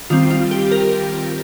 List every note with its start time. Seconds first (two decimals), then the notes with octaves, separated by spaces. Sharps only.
0.10 D#3 G3 C4 F4
0.31 F4
0.51 G4
0.71 A#4